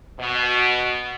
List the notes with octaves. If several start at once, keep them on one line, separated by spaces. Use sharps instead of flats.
B2